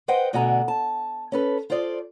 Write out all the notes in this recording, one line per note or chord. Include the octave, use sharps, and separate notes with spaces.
B4 C5 D#5 F#5 G5
D2 B2 D3 F#4 G#5 A#5
A5
C#4 A4 B4
F4 A4 C5 D5 D#5